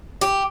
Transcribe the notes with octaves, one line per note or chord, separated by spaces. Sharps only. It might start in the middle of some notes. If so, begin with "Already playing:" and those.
G4